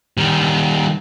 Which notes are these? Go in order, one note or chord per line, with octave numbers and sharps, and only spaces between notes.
D#3 G3